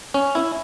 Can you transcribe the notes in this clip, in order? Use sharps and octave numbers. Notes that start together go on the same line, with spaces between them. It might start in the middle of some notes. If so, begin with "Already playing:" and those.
C#4
E4